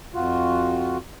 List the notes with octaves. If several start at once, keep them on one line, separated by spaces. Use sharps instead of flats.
F2 F4 F#4